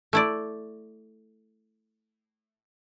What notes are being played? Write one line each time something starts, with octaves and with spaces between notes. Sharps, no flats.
A3 E4 D5